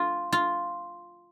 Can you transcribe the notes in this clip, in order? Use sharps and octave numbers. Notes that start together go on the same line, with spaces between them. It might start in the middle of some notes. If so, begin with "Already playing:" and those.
Already playing: F4
F4